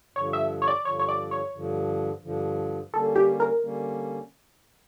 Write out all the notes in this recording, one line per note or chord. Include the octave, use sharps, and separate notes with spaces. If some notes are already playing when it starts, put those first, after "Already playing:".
G2 D3 F3 C#5
E5
C#5
D5
G2 D3 F3 C#5
C#5
D5
C#5
G2 D3 F3
G2 D3 F3
D3 G3 A#3 C#4 A4
G4
A#4
D3 G3 A#3 C#4